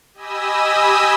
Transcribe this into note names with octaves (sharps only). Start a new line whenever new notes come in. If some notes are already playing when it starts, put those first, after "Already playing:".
G4 D#5 G#5 B5 D#6 E6